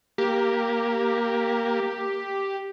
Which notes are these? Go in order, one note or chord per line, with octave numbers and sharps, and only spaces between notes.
A#3 G4